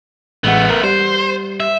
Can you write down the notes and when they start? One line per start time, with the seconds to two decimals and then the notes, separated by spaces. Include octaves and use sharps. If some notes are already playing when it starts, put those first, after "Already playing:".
0.44 A1 G#3 A3 B3 F#5
0.70 A#4
0.84 G3 C5
1.60 E5